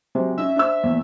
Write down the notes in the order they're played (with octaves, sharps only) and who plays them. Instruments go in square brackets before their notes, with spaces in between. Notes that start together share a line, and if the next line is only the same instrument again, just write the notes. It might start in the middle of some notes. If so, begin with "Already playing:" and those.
[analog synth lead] C3 [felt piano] F#3 G#3
[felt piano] C#4 D#4 [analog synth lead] E5
[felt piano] D4 C5 E6
A#1 E2